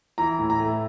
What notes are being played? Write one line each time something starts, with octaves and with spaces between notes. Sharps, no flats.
E3 A#5
A2
A#5
A3